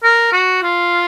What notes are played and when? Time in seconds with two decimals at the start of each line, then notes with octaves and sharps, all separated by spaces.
0.04 A#4
0.32 F#4
0.62 F4